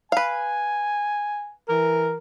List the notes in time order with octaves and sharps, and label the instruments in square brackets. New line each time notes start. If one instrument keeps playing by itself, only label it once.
[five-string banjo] B4 F5 [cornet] G#5
[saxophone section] E3 A#4